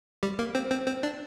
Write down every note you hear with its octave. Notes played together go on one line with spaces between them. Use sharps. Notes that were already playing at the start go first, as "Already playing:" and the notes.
G3 G4
A#3 A#4
C4 C5
C4 C5
C4 C5
D4 D5